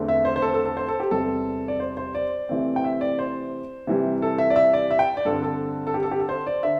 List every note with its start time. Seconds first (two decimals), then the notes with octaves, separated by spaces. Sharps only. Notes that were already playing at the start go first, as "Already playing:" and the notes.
Already playing: E2 D3 A3 C4
0.08 E5
0.25 C5
0.36 C5
0.42 A4
0.54 A4
0.66 A4
0.77 C5
0.88 A4
1.00 G4
1.11 E2 C3 G3 C4 A4
1.68 D5
1.80 C5
1.97 C5
2.15 D5
2.49 C3 E3 A3 C4
2.76 G5
2.84 E5
3.01 D5
3.19 C5
3.87 C3 E3 G3
4.22 A4
4.38 E5
4.50 D5
4.56 E5
4.73 D5
4.91 E5
4.99 G5
5.17 D5
5.25 G2 D3 C4 A4
5.43 A4
5.87 A4
5.94 G4
6.03 A4
6.11 G4
6.20 A4
6.29 C5
6.47 D5
6.63 D3 E5